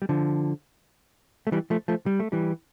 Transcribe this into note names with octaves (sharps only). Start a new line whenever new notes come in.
G3
D3 F3
A3
E3 G3
F3 A3
F3 A3
G3
A3
E3 G3